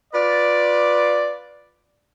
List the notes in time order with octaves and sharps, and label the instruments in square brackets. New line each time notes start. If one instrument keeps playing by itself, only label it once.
[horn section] F4 B4 D5